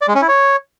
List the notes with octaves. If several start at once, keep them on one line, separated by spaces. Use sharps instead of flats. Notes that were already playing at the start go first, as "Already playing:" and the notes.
D5
G#3
C#4
E4
C#5